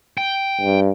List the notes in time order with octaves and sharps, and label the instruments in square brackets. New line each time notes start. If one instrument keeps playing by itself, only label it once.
[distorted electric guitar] G5
[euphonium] G2